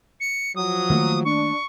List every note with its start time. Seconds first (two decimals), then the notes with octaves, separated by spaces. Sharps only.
0.20 C#7
0.56 F3 F#3 D#6
0.90 D#3 A3 A#3
1.25 D4 C#6